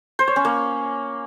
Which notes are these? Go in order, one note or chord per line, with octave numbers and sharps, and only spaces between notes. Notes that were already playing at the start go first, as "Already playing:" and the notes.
C5
C#5
C#4
A#3